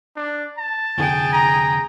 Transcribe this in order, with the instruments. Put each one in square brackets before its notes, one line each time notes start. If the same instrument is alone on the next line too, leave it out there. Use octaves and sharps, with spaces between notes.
[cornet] D4
A5
[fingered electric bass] F1 D3 [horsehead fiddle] G#4 G5
[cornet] A#5